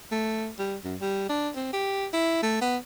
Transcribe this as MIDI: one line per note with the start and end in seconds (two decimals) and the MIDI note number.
0.12 0.50 57
0.59 0.76 55
0.84 0.96 42
1.01 1.26 55
1.29 1.50 62
1.56 1.69 60
1.73 2.07 67
2.13 2.38 64
2.43 2.57 57
2.61 2.77 59